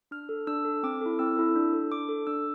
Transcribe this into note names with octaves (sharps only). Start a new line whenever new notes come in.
D4 F6
A4
D4 E6
A4
C4 D6
E4 A4
C4 E6
E4 A4
D4
A4
D4 D6
A4
D4 E6